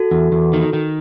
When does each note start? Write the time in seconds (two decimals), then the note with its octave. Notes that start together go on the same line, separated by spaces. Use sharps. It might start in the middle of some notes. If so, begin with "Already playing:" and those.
Already playing: F#4 A4
0.11 E2
0.32 E2
0.53 D#3
0.73 D#3